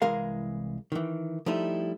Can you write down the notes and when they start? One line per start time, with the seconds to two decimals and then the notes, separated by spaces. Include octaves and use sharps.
0.02 C2 E3 G#3 G#4 A#4 F5
0.92 D#3 E3
1.46 F3 G3 A3 D#4 E4